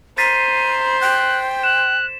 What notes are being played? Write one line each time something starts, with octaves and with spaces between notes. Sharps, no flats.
C5 A#5 A6 B6 C7 D#7
G5 F#6
F#6 E7